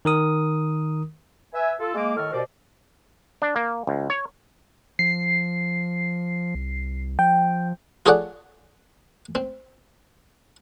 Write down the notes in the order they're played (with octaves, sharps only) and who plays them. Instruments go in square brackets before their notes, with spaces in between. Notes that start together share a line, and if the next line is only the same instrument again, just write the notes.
[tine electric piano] D#3 A#4 D#6
[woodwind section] B4 E5 G#5
F4 A4
G#3 A#3 D6
A2 D#3 A4 D#5 C#6 F6
D#2 B2 C5 D5
[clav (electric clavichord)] D4
A#3
C#2
C#5
[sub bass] F3 [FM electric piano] C7
[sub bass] C2
[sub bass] F3 [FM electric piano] G5
[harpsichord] F4 G#4 A4 C#5 D5 F#5
C4